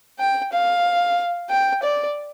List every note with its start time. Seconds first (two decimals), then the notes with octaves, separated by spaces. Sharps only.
0.19 G5
0.53 F5
1.50 G5
1.83 D5